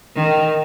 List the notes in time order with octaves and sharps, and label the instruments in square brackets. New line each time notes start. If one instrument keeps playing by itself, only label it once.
[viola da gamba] D#3